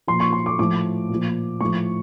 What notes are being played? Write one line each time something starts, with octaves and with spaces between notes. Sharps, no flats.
A#2 F3 C6
C#6
C6
D6
A2 F3 D6
A#2
F3
A2 F3 C#6